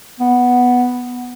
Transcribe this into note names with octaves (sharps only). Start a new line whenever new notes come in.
B3